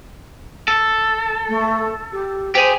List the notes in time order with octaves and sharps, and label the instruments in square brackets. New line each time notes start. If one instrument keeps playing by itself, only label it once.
[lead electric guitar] A4
[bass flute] A3
G4
[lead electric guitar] G4 G#4 [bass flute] C5